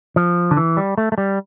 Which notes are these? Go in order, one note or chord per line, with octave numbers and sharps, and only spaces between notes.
F3
D3
E3
G3
A3
A3
G3